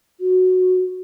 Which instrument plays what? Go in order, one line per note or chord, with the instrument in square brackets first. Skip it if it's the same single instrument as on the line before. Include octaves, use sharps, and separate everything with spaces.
[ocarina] F#4